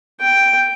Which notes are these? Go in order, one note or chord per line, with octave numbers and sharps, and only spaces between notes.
G5